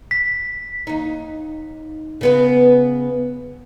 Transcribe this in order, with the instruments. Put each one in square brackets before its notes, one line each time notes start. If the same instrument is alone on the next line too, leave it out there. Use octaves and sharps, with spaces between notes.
[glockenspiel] B6
[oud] D#2 D#4
C#3 B3 B4